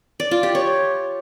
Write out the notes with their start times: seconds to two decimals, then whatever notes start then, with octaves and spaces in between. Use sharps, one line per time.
0.20 D5
0.31 F4
0.43 G4
0.55 C#5